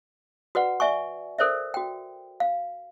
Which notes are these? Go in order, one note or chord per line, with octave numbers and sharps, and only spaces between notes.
F#4 B4 D5 F#5
D5 E5 G#5 C#6
A4 A#4 C5 D5 E5
F#4 G5
F5